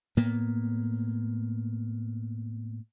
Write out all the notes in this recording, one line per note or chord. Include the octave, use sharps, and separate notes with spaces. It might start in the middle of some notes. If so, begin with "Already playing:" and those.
A2 A#3 B3